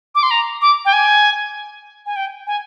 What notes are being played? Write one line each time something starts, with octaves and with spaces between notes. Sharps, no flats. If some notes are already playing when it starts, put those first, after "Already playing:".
D6
C6
A#5
D6
G5
G#5
G#5
G5
G#5